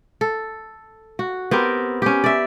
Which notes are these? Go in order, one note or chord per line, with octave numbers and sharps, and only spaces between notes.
A4
F#4
B3 C4 G4 A#4
C#4 G4
D5 E5